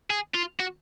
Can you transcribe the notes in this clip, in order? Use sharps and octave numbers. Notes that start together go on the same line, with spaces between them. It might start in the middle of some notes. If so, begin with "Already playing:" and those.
G#4
F4
F#4